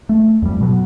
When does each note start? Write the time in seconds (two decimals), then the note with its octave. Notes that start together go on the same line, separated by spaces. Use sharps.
0.09 A3
0.42 F2 G3
0.61 B2 F#3